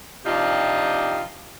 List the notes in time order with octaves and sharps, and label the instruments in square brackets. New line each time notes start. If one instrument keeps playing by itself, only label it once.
[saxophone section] C3 F3 D4 D#4 F4 G4